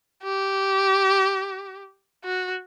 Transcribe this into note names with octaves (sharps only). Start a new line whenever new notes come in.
G4
F#4